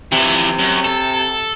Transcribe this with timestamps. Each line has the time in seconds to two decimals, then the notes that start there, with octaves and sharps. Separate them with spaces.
0.12 C3 E3 F3
0.58 F#2
0.84 A4